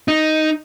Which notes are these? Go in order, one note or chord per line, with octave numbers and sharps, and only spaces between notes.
D#4